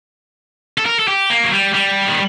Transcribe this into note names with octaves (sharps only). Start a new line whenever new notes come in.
A4
A#4
A4
G4
A#3
F#3
G3
G3
D#3